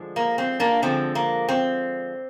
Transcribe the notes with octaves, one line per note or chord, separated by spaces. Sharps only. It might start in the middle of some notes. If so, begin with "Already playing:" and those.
Already playing: D3 F3 G#3
A#3
C4
A#3 D4
D3 F3 G#3 C4
A#3
C4